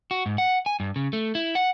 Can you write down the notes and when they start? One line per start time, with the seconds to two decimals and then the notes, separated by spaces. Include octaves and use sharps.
0.11 F#4
0.26 G#2
0.38 F#5
0.66 G#5
0.80 G2
0.96 C#3
1.13 A3
1.35 E4
1.55 F#5